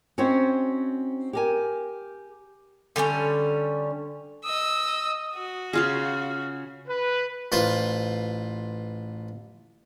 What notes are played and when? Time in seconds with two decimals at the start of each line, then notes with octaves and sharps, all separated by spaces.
0.18 C4 C#4 D#4 F#4 C5 C#5
1.33 G4 A#4 G#5
2.96 D3 G3 A3 C#4
4.45 D#5 D#6 E6
5.35 F#4
5.73 C#3 F4 G#4 F5
6.88 B4
7.52 A1 F4 B4 C5